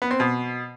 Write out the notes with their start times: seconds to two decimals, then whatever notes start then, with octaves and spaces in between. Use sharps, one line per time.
0.02 B3
0.11 C4
0.20 B2